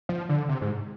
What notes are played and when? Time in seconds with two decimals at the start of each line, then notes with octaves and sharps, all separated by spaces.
0.09 F3
0.29 D3
0.49 C3
0.62 G#2